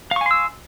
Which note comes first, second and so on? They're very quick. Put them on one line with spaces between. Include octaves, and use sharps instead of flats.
F5 C#6 G#5 C6 E6